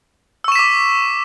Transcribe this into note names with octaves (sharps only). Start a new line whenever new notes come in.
C#6 D6 E6 B6 E7